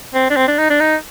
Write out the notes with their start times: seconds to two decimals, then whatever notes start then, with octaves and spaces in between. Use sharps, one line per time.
0.14 C4
0.30 D4
0.36 C4
0.48 D4
0.58 D#4
0.70 D4
0.80 D#4